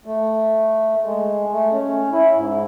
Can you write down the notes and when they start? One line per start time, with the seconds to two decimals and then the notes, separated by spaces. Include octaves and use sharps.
0.06 A3
1.04 G#3
1.52 A3
1.72 C#4
2.12 E4
2.34 G#2